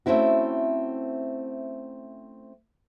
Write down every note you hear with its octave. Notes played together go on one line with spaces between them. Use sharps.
A3 C4 C#4 E4 F#4